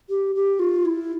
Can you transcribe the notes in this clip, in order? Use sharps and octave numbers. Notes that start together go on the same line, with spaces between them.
G4
G4
F4
E4